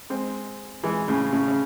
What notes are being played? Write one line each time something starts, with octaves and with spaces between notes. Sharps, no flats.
G#3 C4
E3 G#3
A2 C#3
A2 C#3
C#3